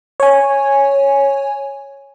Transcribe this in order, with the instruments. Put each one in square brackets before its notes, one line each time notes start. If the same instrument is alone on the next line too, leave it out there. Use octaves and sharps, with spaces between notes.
[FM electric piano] C#5 G#5